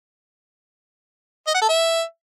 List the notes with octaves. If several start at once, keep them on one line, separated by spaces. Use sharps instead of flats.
D#5
F#5
A4
E5